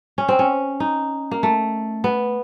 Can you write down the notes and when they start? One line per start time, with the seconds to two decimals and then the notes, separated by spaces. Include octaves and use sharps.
0.18 C#4
0.28 C4
0.39 C#4
0.80 D#4
1.31 A#3
1.43 A3
2.04 B3